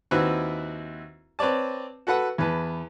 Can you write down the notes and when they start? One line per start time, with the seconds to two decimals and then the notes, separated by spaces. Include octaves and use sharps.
0.11 D#2 C4 E4 F#4 B4 E5
1.39 C4 B4 C#5 D5 A5
2.07 F#4 A4 B4 F#5
2.38 E2 B4 A5